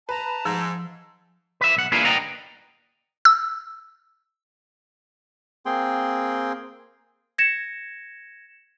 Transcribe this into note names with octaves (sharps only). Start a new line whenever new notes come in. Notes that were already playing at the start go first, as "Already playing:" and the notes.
B4 A5 A#5
G#2 F3 E6
B4 E5
B1 F#5
A#3 D4 E4 F4 G#4 B4
B4 D5 D#5 F#5 G5 A#5
E6
A#3 C4 G#4 G5 C6
G#6 A#6 C#7 E7